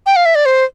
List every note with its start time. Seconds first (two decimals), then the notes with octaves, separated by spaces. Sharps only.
0.06 G5
0.16 F5
0.26 E5
0.35 D5
0.46 C5